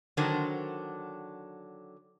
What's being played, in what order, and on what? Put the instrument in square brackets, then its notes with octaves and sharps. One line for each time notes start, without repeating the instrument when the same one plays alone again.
[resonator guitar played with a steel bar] D3 D#3 F#3 D4 A#4 C5